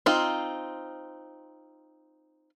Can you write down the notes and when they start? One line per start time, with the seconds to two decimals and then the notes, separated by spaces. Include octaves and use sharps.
0.06 C4 D#4 F4